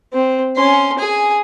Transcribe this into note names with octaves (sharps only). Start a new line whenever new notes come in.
C4
C#4 C6
G#4 G#5